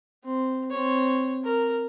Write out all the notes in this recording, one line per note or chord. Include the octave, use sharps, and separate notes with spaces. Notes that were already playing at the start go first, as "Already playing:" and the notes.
C4
C4 C#5
A#4